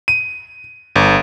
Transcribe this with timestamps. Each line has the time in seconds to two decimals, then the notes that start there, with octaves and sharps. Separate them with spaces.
0.08 D#7
0.96 G1